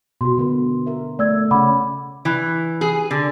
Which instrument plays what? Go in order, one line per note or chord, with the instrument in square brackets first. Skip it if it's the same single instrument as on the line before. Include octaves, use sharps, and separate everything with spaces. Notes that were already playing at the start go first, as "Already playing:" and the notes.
[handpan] B2 [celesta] F#4 C6
[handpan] D3 B3 A#4
A#4 E5
[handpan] A3 [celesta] D5 E6 G#6
[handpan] C#3 C#4 [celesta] F#5 B5 D6
[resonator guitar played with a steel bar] E3
G#4
D3